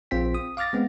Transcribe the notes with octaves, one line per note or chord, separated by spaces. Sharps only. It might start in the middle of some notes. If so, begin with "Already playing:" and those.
A#1 C4 F4 G5 B6
D#6
F5 D6 F6 A6 A#6
G#3 B3 C4